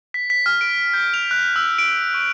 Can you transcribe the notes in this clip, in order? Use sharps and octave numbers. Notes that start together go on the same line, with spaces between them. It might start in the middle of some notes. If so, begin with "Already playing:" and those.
B6
B6
F6
D7
G6
F7
F#6
E6
D7
C#6